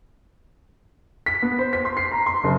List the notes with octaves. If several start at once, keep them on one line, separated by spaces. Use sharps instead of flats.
B6
B3
C5
B6
C6
C7
A#5
C6
F#1